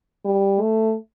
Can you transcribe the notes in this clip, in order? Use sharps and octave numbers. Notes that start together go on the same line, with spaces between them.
G3
A3